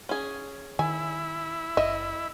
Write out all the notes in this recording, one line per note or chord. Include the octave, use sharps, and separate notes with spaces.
C#4 G#4
D#3 E4 G#5
F#1 D#5 E5